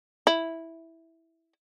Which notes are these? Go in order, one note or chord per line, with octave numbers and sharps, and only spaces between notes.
E4